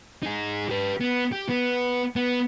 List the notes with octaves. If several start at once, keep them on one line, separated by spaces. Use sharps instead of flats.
D#4 G#4
G4 B4
B3
G4
B3
B3